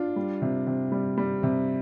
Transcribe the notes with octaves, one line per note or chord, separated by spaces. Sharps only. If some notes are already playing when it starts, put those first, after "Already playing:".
Already playing: D4 F4
G3
C3
C3
G3
G3
C3